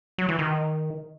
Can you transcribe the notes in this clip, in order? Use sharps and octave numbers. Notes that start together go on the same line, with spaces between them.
F#3
E3
D#3